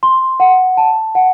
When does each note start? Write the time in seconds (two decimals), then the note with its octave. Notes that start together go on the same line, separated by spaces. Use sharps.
0.03 C6
0.40 F#5
0.77 A5
1.15 F#5